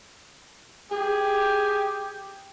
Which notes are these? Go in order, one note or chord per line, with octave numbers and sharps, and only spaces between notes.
G4 G#4